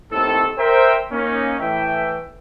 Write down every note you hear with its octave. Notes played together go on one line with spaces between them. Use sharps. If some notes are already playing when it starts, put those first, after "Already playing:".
D#2 A2 D#3 C4 A4
A#4 C5 E5 G5
A#3 C#4 D#4
A2 E3 E5 G5